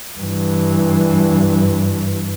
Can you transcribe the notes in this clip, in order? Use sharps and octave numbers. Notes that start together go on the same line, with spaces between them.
G2 E3